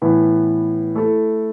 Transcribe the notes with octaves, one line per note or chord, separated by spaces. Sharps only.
A2 E3 B3
A3 E4 A4